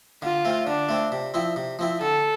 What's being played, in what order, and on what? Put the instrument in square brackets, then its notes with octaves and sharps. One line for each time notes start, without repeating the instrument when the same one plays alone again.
[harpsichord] D3 [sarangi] F4
[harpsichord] A3 C4
[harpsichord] D3 [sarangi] D4
[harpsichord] A3 C4
C3
F3 C4 E4
C3
F3 C4 E4
[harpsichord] D3 [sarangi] A4